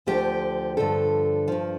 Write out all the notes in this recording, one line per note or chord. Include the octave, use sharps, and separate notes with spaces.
D2 D3 F3 G4
G2 D3 F3 A4
G2 F3